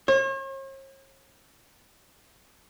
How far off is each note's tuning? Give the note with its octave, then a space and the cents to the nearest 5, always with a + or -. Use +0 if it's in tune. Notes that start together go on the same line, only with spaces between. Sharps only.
C#5 -45